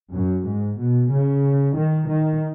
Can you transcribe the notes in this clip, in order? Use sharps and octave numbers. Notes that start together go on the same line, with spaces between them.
F#2
G#2
B2
C#3
D#3
D#3